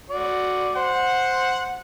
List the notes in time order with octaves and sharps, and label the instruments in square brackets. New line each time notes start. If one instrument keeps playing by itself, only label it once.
[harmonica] F#4 D5
[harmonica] C5 [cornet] F#5